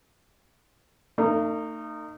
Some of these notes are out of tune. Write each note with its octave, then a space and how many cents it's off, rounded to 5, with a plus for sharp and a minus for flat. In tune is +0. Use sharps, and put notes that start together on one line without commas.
A3 +45 D#4 -20